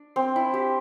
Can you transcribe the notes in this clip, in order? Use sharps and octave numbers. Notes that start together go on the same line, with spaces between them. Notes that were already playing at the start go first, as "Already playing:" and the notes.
Already playing: D4
C4
E4
G4